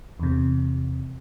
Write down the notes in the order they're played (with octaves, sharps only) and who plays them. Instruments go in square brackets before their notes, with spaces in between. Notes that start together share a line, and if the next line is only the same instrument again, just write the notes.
[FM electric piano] E2 C3